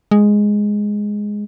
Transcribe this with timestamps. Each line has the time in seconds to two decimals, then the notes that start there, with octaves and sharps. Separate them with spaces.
0.11 G#3